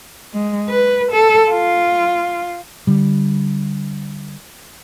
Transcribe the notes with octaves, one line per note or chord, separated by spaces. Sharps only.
G#3
B4
A4
F4
D3 G3